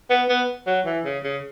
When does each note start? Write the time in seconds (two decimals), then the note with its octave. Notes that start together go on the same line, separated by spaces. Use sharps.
0.10 B3
0.29 B3
0.67 F#3
0.86 E3
1.05 C#3
1.24 C#3